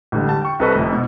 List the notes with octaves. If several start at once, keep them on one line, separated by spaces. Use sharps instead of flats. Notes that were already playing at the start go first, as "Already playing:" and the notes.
A1 D3 G3
G3 A5
G5 C#6
C2 C3 A4 B4 D#5 C#6
F1 F2
B2